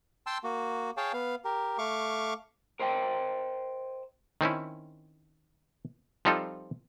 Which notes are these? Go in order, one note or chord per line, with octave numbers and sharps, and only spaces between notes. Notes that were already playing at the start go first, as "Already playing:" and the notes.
G5 A5 C6 E6
A#3 F#4
G#4 C#5 F5 G5 A5
B3 F5
G4 A#4
A3 F5 C#6 D6
A#4 C5 D#5 G5
D#3 C4 C#4 E4
F3 G3 C4 D#4 F4 A4